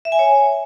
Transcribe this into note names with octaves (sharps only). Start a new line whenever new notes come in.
E5
G#5
C#5